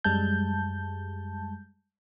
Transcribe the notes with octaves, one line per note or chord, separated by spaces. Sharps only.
F#2 G3 G#3 A5 G6